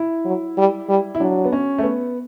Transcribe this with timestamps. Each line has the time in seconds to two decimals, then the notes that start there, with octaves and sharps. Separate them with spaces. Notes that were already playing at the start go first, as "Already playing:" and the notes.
Already playing: E4
0.25 F#3
0.57 G3
0.89 G3
1.15 E4
1.20 F#3 D4
1.45 B3
1.52 C#4
1.78 A3
1.83 B3